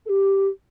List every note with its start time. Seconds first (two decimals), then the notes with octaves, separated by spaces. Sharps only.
0.06 A4
0.09 G4